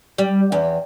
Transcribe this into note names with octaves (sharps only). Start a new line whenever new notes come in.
G3
E2